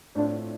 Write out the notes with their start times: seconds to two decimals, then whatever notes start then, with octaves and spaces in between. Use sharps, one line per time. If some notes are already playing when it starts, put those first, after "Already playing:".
0.15 A2 A3 C4 D4 F4